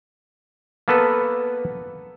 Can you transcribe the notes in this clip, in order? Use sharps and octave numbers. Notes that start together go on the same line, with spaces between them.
A#3 B3 A4 B4